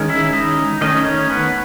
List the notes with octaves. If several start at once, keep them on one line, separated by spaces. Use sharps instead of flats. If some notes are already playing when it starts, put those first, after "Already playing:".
Already playing: D#3 G#3 C#4
E4 E5
D#4 D#5
D#3 A3 C#4 D#4 D#5
C#4 C#5
B3 B4